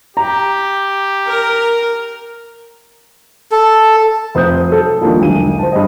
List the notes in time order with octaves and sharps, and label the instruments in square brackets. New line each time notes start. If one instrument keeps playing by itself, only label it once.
[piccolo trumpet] G4 [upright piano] A#5
[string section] A#4
[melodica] A4
[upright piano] F1 C5 D#6 G6
F#3 A4
D#3 F3 G3 A#3 D4
E1 B1 D3 D#7
C5 A5
G2 D#5